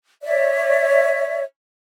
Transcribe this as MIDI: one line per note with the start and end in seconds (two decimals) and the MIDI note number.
0.22 1.42 73
0.22 1.42 74
0.22 1.42 76